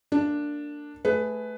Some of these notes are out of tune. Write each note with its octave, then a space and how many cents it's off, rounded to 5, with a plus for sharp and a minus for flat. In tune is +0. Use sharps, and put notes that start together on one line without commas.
A#3 -35 D4 +0
A3 -15 G#4 +0 B4 +10